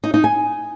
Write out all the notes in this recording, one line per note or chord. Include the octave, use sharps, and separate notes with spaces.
D#4
D#4
G#5